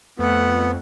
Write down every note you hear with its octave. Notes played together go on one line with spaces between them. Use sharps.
F2 A3 B3 F#5